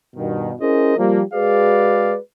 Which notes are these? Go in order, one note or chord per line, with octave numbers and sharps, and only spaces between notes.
G2 B2 D#3
C#4 E4 G#4 A#4 C5 D#5
F3 G3 A#3
G#3 F#4 G#4 B4 D5 F5